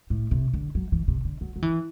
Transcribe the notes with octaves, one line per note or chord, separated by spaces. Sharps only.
A2
C3
D3
F#3
E3
C3
D3
F#3
F#3
E3